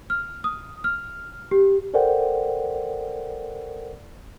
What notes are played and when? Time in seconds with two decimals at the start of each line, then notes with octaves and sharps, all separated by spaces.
0.10 F6
0.44 D#6
0.84 F6
1.51 G4
1.94 A4 A#4 C5 D5 F#5 G5